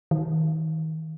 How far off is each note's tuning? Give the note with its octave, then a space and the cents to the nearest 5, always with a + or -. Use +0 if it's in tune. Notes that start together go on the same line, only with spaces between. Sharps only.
D#3 +35